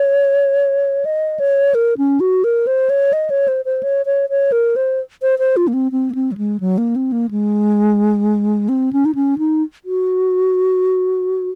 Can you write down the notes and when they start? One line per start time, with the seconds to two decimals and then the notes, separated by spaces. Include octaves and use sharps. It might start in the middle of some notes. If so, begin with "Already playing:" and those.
Already playing: C#5
1.05 D#5
1.40 C#5
1.75 A#4
1.98 C#4
2.20 F#4
2.44 A#4
2.67 C5
2.90 C#5
3.13 D#5
3.30 C#5
3.48 C5
3.65 C5
3.83 C#5
4.06 C#5
4.30 C#5
4.52 A#4
4.76 C5
5.22 C5
5.39 C5
5.57 F4
5.68 A#3
5.74 C4
5.92 C4
6.10 A#3
6.15 C4
6.32 F#3
6.37 G#3
6.60 F#3
6.78 A#3
6.96 C4
7.12 A#3
7.31 G#3
8.69 C4
8.93 C#4
9.05 D#4
9.15 C#4
9.38 D#4
9.85 F#4